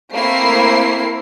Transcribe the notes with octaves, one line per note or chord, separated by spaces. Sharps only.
A3 A#3 C4 E4 A#4 C7